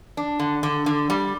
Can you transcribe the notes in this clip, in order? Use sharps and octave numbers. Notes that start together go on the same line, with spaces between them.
D4
D3
D3
D3
G3